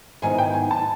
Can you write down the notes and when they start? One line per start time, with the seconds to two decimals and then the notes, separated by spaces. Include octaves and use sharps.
0.22 G#2 D#3 F#3 B3 E4 G#5
0.38 G5
0.54 G#5
0.71 A5